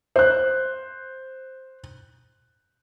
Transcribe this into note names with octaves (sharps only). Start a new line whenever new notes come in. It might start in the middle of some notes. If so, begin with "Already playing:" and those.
C5 F#6